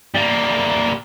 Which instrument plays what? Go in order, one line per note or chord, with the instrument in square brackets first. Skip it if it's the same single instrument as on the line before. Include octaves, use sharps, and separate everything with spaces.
[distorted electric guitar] G3 A#3